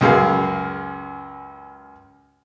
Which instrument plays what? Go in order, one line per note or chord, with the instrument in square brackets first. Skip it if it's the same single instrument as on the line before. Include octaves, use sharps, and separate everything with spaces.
[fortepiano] C#2 F#2 G#4 F5